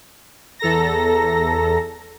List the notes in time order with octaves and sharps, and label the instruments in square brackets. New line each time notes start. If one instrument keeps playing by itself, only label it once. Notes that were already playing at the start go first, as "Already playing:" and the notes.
[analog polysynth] E2 A4 A#5 A#6